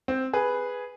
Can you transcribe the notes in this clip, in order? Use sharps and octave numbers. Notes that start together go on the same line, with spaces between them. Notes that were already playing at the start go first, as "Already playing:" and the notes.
C4
G#4 B4